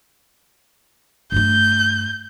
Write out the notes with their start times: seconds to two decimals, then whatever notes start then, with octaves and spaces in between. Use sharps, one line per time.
1.32 G2 A3 G6